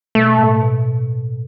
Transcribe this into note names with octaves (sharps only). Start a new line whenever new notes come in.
B2 A3
A2
B2